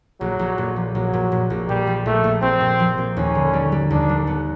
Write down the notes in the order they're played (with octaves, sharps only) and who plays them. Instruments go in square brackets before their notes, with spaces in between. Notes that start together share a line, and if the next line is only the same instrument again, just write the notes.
[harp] A#1 [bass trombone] F#3
[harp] A#1
A#2
F3
[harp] A#1 [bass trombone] F#3
[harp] A#2
A#2
A#1
[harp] A#2 [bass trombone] G3
[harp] F3
[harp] A#1 [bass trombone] A3
[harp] A#1
[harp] A#1 [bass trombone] C4
[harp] A#2
F3
A#2
[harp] D#2 [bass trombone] C#4
[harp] D3
G3
G3
[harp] D#2 [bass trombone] D4
[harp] G3
B3